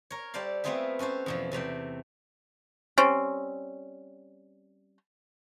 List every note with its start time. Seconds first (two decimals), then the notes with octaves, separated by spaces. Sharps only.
0.10 A#4 C#5
0.34 G3 A4 C5 D5 F5
0.64 A3 B3 C4 F4 G#4 E5
0.99 C#4 F#4 A4 C5
1.26 E2 B2 F3
1.52 E2 C3 A3 G5
2.98 G3 C4 C#4